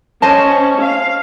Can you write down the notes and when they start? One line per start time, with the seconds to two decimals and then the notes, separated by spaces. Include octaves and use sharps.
0.22 C#4 C5 D#5 A5
0.82 F5